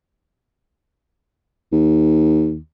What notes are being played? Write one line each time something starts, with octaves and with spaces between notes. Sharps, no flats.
D#2